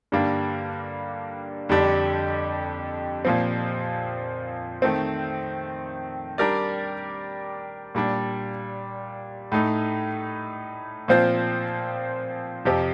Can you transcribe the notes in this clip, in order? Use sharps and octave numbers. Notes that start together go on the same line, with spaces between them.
G2 D3 G3 A#3 D4
F2 D3 G3 D4 G4
A#2 F3 C4
D#3 A3 C4
G3 D4 G4 A#4 D5
A#2 G3 D4
A2 A3 D#4
A#2 F3 C4 F4 C5
F2 C3 F3 C4 G4